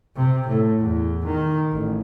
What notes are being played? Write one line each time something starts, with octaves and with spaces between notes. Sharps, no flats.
C3
A2
E2
D#3
A1